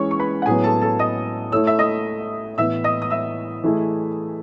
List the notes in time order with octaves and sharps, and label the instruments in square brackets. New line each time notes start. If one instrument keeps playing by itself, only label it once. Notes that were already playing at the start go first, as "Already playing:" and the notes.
Already playing: [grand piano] E3 G#3 C#4 [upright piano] C#5 C#6
[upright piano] C#6
B4 B5
F#5
[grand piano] A2 F#3 B3 [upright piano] G#4 G#5
[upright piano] A4 A5
A4 A5
D#5 D#6
[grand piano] A3 E4 A4 C#5 [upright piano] E6
[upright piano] E5 E6
D#5 D#6
[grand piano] A2 E3 B3 [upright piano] E5 E6
[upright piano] D#5 D#6
D#6
E5 E6
[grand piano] E3 A3 E4 G#4